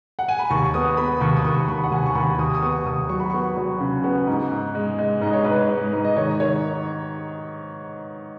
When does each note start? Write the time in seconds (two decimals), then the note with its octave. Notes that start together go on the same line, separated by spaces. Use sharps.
0.19 F#5
0.28 G#5
0.39 B5
0.50 D#2 C#6
0.74 B3 D#6
0.97 B3 B5
1.21 D#2 C#6
1.37 D#6
1.45 D#2 C#6
1.67 D#2 B5
1.84 F#5
1.91 D#2 G#5
2.06 C#6
2.15 D#2 B5
2.38 D#2 D#6
2.55 D#6
2.62 B3 C#6
2.76 C#6
2.85 D#2 D#6
3.09 F#3 C#6
3.20 B5
3.30 B3 C#6
3.57 F#3
3.80 C#3
4.04 B3
4.27 G#2
4.51 G#2
4.75 G#3
4.98 G#3
5.21 G#2 D#5
5.33 C#5
5.44 G#2 B4
5.56 C#5
5.69 G#3
5.93 G#2
6.05 D#5
6.16 D#3 C#5
6.40 D#3 C#5